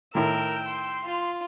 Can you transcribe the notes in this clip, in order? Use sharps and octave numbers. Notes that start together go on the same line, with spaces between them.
A2 D#3 A#4 G5 E6
C6
F4